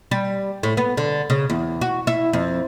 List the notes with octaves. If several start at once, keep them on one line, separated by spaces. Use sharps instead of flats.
G3
A2
B3
D3
C#3
E2
F#4
E4
F2